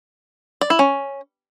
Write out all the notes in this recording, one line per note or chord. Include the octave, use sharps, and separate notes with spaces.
D5
E4
C#4